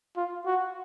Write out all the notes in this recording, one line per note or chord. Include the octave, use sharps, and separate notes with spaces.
F4
F#4